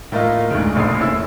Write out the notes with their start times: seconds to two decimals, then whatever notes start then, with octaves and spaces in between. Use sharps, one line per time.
0.12 A2 A3 A#3 F4 D#5
0.50 D2 G#2 C#3
0.75 F1 A#1 A#2 D#6 C7
1.01 C#4 E4 E6